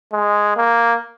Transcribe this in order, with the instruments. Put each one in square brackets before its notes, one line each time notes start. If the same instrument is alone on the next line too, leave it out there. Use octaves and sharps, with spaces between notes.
[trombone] G#3
A#3